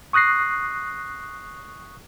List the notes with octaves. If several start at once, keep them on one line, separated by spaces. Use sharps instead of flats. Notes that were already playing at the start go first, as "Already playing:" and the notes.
C#6 D#6 F#6 A#6 C7